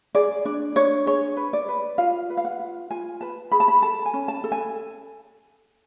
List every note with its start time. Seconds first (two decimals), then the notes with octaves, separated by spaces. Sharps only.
0.15 G#4 D5
0.45 D4 D5
0.76 D4 C#5
1.06 G#4 C#5
1.37 B4
1.53 D5
1.69 B4
1.98 F4 F5
2.30 B4
2.37 F5
2.45 F#5
2.60 F4
2.90 F4 G#5
3.21 B4 A5
3.51 G#4 B5
3.60 A5
3.68 B5
3.82 A4 A5
4.05 G#5
4.14 C#4
4.28 A5
4.44 A4
4.52 G#5